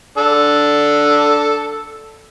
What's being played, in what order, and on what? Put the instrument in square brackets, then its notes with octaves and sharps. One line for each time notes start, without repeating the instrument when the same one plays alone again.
[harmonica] D4 A4